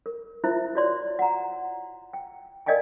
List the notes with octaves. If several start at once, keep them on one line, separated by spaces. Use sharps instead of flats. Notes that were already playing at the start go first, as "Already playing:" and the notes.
A#4
E4 F4 A#4 C5 E5
F#4 C#5 D5 C6
F#5 A#5
G5
A#4 D5 D#5 F5 G5 G#5